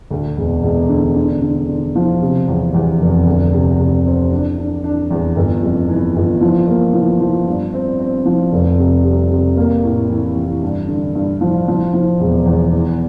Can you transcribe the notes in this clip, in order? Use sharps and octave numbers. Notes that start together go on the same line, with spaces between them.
D2
E1
E1
D3
D3
D3
D3
F3
C3
E2
E2
F1
D2
C3
C3
C4
D4
D4
D4
E2
G1
F2
E3
G1
F3
A#3
F3
F3
G2
C4
C4
F3
F1
C3
G3
C3
A#3
A2
E3
E3
G2
D3
G2
F3
F3
F3
E1
E2
E3